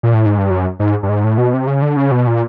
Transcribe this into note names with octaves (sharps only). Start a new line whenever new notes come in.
A#2
A2
G#2
G2
F#2
G#2
G2
G#2
A2
B2
C3
C#3
D3
C#3
B2
A#2